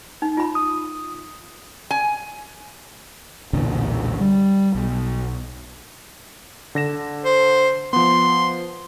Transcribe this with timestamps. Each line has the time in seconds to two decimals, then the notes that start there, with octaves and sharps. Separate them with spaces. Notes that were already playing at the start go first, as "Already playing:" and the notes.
0.22 D#4
0.37 F4 B5
0.55 D#6
1.91 G#5
3.53 B1 E2 A#2 D3
4.20 G3
4.75 B1
6.75 D3 A#6 E7
7.25 C5
7.93 F3 B3 C6